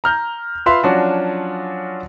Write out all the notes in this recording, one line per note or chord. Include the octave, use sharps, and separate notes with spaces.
A#5 F6 G6
F4 B4 E5 F5 B5 C6
F3 F#3 C#4 D4 F4 F#4